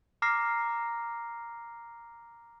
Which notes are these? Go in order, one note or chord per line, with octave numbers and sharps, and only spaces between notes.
A#5 D6 F6 A#6 C7